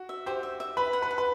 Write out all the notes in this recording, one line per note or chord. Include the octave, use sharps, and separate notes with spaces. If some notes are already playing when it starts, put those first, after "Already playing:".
Already playing: F#4
E5
G4 C5
E5
E5
B4 B5
F#5
B4
B5
B4